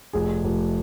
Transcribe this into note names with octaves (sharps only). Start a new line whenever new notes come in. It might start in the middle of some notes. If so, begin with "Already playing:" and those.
F1 G#4
F1